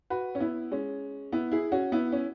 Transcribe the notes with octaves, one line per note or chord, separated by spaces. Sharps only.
F#4 B4
C#4
B3 E4
G#3 C#4
B3 E4
E4 G#4
C#4 F#4
B3 E4
C#4